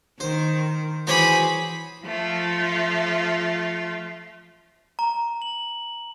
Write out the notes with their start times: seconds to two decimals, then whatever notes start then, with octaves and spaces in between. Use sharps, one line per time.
0.20 D#3 C5
1.07 E3 F#4 G#4 C5 C#5 B5 D6
2.03 F3 A3 F4
4.99 A#5
5.42 F#7